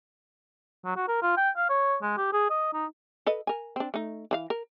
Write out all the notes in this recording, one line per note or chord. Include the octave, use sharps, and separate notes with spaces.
F#3
F#4
A#4
F4
G5
F5
C#5
G#3
G4
G#4
D#5
D#4
A4 B4 D#5
A#4 G#5
C4 D4
A3 D#4
E3 E4 F5
A#4